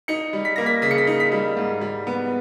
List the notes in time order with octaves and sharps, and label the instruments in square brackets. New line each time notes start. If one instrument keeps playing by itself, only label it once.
[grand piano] D#4 C#7
G3
B6
A#3 A#6
B6
C#3 B6
C#7
B6
D#4
B6
G3
G#2
G3
B3